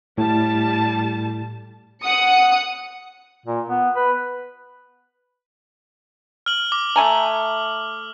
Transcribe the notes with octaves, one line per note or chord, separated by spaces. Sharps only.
A2 G3 A5
F#5 D#6 C#7
A#2
B3
B4
F6 F#7
D6
A3 G#5 A#5